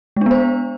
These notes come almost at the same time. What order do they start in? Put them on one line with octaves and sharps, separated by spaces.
G#3 D4 B3 C5